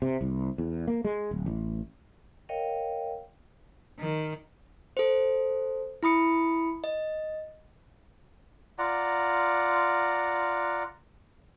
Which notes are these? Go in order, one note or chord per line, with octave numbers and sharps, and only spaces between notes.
C3
C2
E2
A#3
G#3
D1
A1
A#4 C#5 D#5 F5 G5
D#3
A4 C5
E4 B5 D#6 C#7
D#5
F4 D5 F#5 A#5